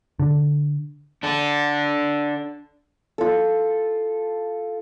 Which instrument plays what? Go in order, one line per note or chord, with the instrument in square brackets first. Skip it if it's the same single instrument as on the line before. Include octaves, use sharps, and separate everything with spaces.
[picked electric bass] D3
[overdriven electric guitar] D4 A4
[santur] F4 A4